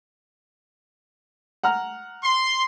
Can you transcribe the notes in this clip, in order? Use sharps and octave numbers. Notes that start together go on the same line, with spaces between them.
F#5 A#5 F6
C6